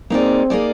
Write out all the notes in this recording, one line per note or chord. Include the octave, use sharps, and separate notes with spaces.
A#3 C4 D#4 G#4 D5
A#3 D#4 G#4 D5